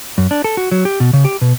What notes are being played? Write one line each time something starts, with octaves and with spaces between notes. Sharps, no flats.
F#2
D4
A4
F#4
F#3
G4
B2
C#3
G4
B2